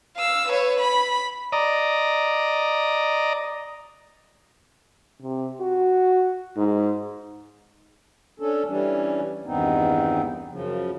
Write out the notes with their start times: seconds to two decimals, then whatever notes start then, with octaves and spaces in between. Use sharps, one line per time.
0.17 F5 E6
0.49 B4 C#5
0.80 B5
1.52 D5 D#5 A#5
5.22 C3
5.61 F#4
6.57 G#2
8.40 C#4 D4 A4
8.66 E3 G3 C#4 D4
9.45 E2 G2 D#3 B3 C4 D#4
10.49 F#2 C#3 F3